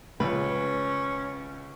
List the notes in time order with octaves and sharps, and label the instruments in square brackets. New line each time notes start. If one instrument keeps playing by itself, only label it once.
[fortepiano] C#2 [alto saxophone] C#4 [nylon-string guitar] B4